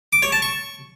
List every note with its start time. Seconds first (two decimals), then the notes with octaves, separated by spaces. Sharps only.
0.13 D6
0.23 C#5
0.32 A5
0.42 C#6